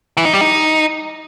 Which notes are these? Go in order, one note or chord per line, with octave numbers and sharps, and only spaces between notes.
E3
D#4
G3
D#4